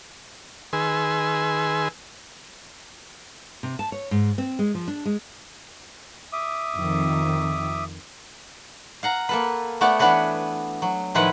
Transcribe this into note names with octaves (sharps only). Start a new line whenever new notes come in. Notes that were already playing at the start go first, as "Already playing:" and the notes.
D#3 G#4 B4 G#5 C6 E6
C3
A5
C#5
G#2
C4
G#3
F3
D4
G#3
E5 D6 D#6
F2 D#3
F5 F#5 A#5
A#3 A4 B4
A3 B3 F#4 D5
E3 B3 D4 F#4 B4 C#5
F#3
A2 D#3 F3 E4 B4 F#5